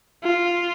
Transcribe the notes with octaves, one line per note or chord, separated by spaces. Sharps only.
F4